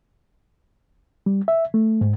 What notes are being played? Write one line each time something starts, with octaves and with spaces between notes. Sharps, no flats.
G3
E5
A3
G#2